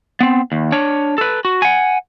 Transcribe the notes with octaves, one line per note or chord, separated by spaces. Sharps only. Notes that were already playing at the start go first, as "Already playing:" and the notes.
B3 C4
D#2
D4 C#5
A4 B4
F#4
F#5 G#5